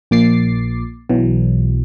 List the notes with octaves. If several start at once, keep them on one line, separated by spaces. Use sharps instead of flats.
A#1 A#2 D6 A6 C7
B1 B2 E3 F#3